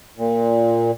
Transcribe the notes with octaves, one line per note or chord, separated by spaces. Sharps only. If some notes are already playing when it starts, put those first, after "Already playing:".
A#2